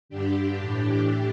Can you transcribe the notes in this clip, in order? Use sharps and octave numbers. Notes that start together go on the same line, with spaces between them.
G2 D3 D4 G4
A2 E3